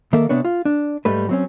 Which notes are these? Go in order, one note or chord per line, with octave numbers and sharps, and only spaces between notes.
D#3 A#3 A4 E5
C3 B3 D4 C#5
F4
D4
G#2 G3 A3 B4
F#3 C4 C#4